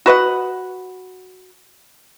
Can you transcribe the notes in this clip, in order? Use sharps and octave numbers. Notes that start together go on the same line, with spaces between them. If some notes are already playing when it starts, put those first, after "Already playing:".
F#4 B4 D#5 F#5